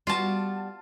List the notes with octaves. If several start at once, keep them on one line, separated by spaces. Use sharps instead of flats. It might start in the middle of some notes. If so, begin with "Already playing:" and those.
G3 B3 F4 F#4 A5